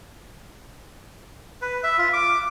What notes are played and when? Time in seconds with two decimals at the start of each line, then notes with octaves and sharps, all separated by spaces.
1.62 B4
1.84 E5
1.98 F4
2.13 D6